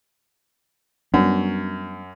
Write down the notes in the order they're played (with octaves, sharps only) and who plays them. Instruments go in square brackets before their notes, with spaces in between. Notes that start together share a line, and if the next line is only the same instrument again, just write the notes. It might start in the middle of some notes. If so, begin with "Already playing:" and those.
[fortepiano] F#2 [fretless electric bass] G3 B3 D4